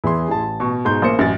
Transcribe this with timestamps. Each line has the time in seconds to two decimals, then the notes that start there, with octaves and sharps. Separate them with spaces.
0.04 E2 E4 G#4 C6
0.29 A1 A5
0.60 B2 C#6
0.85 G#2 C6 G6
1.02 A1 A#3 C5 C#7
1.19 A1 F#2 A6